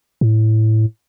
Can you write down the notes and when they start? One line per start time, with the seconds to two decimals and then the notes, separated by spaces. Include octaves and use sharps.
0.21 A2